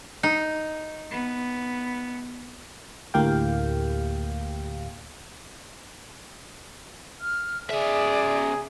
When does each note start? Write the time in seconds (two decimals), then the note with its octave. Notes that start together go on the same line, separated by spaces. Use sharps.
0.23 D#4
1.11 B3
3.14 D2 A2 A#3 G4 F5 G5
7.20 F6
7.70 C#3 G#4 D5 E5